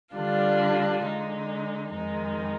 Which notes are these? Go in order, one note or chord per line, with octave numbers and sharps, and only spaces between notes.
D3 G3 D4 F4
D3 G#3 D#4
F2 D#3 G#3 D#4